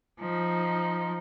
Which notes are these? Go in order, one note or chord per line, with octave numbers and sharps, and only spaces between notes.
F3 D#4